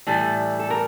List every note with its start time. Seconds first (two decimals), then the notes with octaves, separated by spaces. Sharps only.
0.07 A2 E3 G3 A4
0.59 A4
0.70 A#4